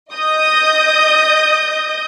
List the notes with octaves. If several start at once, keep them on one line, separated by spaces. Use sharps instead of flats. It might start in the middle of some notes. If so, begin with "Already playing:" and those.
D#5 D#6 G6